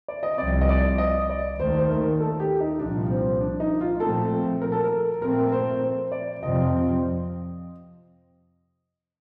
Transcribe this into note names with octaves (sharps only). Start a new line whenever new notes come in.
D5
D#5
C2 C3 F3 C4 D5
D#5
D5
D#5
D5
D#2 D#3 A3 C5
C5
A#4
A4
G4
D#4
C2 A#2 F3 D4
C4
D4
D#4
F4
A#2 F3 A3 C4 A4
A#4
A4
A#4
A#2 F3 A3 C4 A#4
C5
C5
D5
F2 C3 F3 C4 D#5